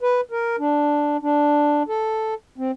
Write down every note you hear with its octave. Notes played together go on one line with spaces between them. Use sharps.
B4
A#4
D4
D4
A4
C4